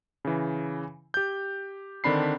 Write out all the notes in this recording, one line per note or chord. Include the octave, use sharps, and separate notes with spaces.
C#3 E3
G4 G6
D3 D#3 C4 D4 B5 C7